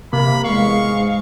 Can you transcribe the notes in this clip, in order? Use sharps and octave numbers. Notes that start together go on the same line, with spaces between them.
C3 A#3 B5
E2 G#3 F5 C#6
G#2